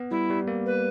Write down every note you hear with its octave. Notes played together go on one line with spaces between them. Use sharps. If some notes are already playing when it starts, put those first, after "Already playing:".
Already playing: B3
G3 E4
G3
A#3
B4